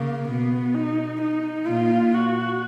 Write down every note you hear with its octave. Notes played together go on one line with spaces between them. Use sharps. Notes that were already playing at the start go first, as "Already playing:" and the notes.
Already playing: C#3 A#3
B2 B3
D#4
D#4
A#2 F4
F#4